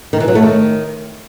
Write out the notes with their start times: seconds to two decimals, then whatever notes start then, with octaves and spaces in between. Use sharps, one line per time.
0.13 D#3
0.20 E3
0.28 F#3
0.35 A3
0.43 D#3